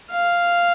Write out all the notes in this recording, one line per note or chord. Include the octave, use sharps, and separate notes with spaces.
F5